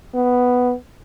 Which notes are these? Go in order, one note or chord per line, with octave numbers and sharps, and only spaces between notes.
B3